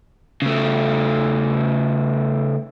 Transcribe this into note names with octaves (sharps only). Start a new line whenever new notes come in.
C#3 A3